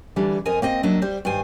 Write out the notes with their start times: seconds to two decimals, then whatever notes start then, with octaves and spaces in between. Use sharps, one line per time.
0.16 D3 E3 G3 D4
0.46 F2 A#4 D#5 G#5
0.62 A#3 C4 D#5
0.83 F#3 A#3 D4 D#5 E5
1.02 G3 C5
1.25 G2 D#3 C5 G#5